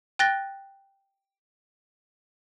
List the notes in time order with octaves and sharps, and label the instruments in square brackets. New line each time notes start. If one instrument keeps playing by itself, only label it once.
[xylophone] G5 F#6 A6 A#6 G7